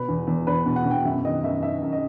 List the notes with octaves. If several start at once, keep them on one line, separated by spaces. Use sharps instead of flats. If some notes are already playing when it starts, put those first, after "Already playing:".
Already playing: B2 B4
E2
E2
E2 B4
B2
F#5
B2
G5
F#2 E5
D#3 D#5
F#2 E5
D#3 E5
F#2
D#5